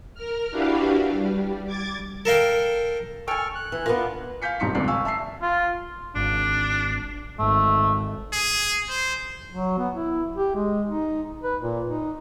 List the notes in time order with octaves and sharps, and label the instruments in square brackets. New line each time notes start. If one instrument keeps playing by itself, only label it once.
[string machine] A#4 F6
D4 E4 F#4 G4 B4 F5
G3
D6 G#6 A6
[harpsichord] A4 A#4 F5 G5
[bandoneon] A4 C#6 F6 [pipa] G5 G#5
[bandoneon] F#6
[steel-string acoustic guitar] E3
[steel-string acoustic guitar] B3 D4 F4 [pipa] A#4
[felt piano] F5 G#5 G6 B6 C#7
E1 G2 D#4 C6 B6 C#7
D#1 G#1 C#2 A3 D5 C7
F5 G#5 C#6 E6
E5 A5 E6 C7
[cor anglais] F4
[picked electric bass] G#1 [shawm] D4
[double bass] G#1 [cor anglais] A3
[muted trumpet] G#4
C5
[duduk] F#3
B3
E4
G4
G#3
D#4
B4
A#2
D#4